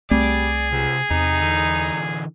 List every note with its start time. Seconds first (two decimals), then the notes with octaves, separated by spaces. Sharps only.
0.11 C2 G3 A3 C4 G#4 D5
0.72 C#2 C3
1.10 E2 C3 D#4
1.42 D3 E3